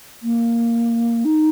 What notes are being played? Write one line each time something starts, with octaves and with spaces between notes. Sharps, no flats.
A#3
D#4